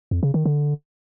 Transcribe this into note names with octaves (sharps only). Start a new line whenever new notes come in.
F2
C#3
D#3
D3